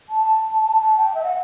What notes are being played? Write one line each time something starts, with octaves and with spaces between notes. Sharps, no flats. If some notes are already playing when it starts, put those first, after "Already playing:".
A5
A5
G5
E5
F#5